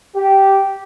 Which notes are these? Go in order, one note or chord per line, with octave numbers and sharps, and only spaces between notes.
G4